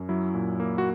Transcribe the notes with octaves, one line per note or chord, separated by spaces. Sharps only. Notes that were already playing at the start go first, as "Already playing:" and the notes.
Already playing: F#2
F#3 E4
A#2
A#3
F#4